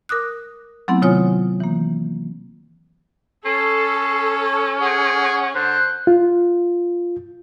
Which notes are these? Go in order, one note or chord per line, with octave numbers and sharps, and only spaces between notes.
A#4 D6 D#6 F#6
F#3 A3 B3 C4 E4
C3 D#3 F4 C#5 G#5 D#6
E3 A#3
C#4 A4 C7
G#4 F#5
D3 C5 F#6
F4